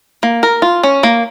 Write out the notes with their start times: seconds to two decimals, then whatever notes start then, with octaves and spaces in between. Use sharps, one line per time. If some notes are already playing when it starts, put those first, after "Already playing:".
0.23 A#3
0.43 A#4
0.62 F4
0.83 C#4
1.03 A#3